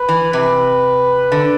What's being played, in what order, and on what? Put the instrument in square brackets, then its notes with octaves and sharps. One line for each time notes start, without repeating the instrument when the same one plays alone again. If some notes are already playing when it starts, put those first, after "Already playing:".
Already playing: [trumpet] B4
[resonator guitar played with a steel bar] E3
[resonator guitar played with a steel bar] C3 [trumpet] B4
[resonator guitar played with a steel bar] D3